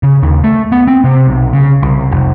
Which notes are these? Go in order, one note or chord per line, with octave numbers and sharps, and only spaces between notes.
C#3
D#2
A3
B3
C4
C3
B1
C#3
C2
F1